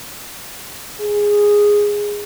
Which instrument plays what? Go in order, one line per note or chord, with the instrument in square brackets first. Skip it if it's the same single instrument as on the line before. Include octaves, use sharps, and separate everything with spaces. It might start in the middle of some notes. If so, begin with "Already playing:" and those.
[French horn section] G#4